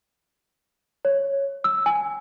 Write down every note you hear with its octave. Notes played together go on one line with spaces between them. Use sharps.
C#5
E6
G#5